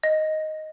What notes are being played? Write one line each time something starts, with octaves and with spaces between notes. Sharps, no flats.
D#5